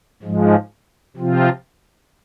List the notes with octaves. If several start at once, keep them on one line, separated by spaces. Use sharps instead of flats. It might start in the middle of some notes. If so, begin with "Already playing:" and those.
G#2 F3 G#3
C3 F3 C4 F4